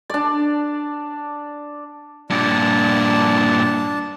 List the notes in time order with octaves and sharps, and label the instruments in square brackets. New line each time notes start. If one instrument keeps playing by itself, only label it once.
[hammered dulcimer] D4 D5
[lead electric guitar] G2 A#2 [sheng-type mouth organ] D4 A5